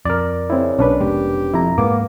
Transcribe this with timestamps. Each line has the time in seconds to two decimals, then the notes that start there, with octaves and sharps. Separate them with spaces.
0.05 F2 A#4 D5
0.50 C#3 C4 E4
0.79 B1 C#4 D4 B4
1.00 F1 B2 G#3 G4
1.54 F2 E4 A#5
1.78 G#2 G#3 A#3 B3 D6